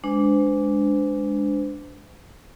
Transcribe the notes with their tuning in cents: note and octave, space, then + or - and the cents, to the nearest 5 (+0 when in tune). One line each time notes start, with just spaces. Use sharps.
G#3 +0 D4 -10 C5 -45